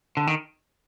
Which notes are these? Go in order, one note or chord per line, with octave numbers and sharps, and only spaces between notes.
D3
D#3